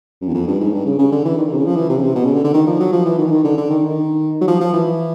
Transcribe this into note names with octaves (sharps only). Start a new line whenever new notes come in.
F#2
E2
F2
G2
G#2
G2
C#3
C#3
D3
E3
D#3
D3
C3
C#3
F3
E3
C3
C#3
C3
B2
C#3
D3
D3
D#3
F3
F#3
F3
E3
D#3
E3
D#3
D3
D3
D#3
D#3
F#3
F3
F3
E3